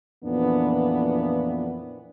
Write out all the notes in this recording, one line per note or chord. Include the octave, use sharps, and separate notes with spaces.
F2 A#2 E3 B3 D4